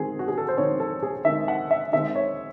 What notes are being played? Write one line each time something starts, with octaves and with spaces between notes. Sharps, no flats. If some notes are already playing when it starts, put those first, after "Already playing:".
Already playing: D#3 G#3 C4 F#4 G#4
F#4
G#4
A4
C5
D#3 G#3 C4 C#5
A4
G#4
D#3 G#3 C4 E5
F#5
E5
D#3 G#3 C4 E5
C#5